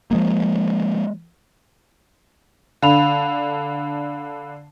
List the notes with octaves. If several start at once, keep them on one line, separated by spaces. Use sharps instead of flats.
F3 G#3 A#3
D3 F5 B5 F7